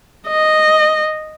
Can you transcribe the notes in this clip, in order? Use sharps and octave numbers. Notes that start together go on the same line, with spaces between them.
D#5